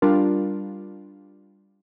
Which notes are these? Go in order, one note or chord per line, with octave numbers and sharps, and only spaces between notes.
G3 D4 F4 A#4